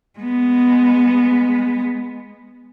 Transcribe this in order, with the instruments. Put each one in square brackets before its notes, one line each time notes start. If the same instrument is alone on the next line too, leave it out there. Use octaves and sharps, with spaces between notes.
[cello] G#3 B3